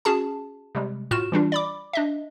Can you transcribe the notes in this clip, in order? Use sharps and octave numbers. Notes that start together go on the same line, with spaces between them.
C#4 F#4 G#4 A5
C3 G3 G#3
A2 F4 F#4 F6 E7
E3 G3 D4 F4
D5 B5 D6
D4 D#5 E5